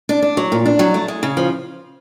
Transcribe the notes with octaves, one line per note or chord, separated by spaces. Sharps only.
D4
D4
F#3
A#2
D4
F#3
A3
G#3
C#3
F3